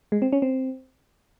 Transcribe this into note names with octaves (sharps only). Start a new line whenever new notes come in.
G#3
C4
C#4
C4